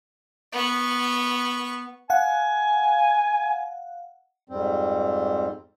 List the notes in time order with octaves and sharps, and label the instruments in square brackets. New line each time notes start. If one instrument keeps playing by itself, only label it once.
[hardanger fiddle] B3 C#6
[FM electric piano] F5 F#5 [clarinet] G#5
[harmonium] F2 G#2 G3 C4